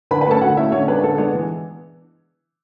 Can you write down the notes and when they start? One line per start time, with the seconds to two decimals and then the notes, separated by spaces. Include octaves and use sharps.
0.11 D3 B4 B5
0.21 B4 B5
0.26 A3 C#4 A4 A5
0.41 D3 F#4 F#5
0.57 A3 C#4 E4 E5
0.72 D3 C#4 C#5
0.88 G#3 B3 D4 B4
1.03 D3 A4
1.18 G#3 B3 D4
1.34 E3